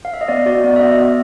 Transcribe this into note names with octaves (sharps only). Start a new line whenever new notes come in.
F5
E5
D#5
B3 D5
F#4 D5
B3 D5
E5
B3 D#5
B3 D#5